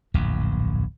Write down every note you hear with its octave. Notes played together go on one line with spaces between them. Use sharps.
D1 A#1 F2